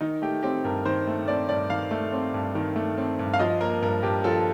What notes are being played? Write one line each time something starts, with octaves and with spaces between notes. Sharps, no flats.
D#3 D#4
A3 G4
C4 G4
G2 A#4
D#3 C5
A3
C4 D5
G2 D5
D#3 F5
A3
C4
G2
D#3
A3
C4
G2
F5
F3 D#5
A#3 A#4
G2 A#4
G2 G4
F3 A4